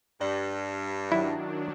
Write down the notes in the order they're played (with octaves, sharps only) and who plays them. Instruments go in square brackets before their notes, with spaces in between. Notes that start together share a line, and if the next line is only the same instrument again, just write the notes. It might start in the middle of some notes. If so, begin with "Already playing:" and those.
[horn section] G2 [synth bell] D5
[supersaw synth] D#3 F#3 D4 [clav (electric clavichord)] E4